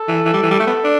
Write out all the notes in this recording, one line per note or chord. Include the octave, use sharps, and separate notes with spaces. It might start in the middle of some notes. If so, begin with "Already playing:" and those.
Already playing: A4
E3
E3
G3
E3
G3
A3
B3
D4